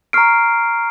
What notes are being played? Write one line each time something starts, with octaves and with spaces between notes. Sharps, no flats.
A#5 C#6 F6 C7 D7